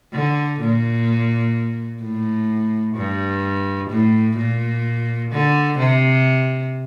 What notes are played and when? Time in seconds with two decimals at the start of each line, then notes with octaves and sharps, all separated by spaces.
0.13 D3
0.60 A#2
2.02 A2
2.96 G2
3.90 A2
4.37 A#2
5.31 D3
5.78 C3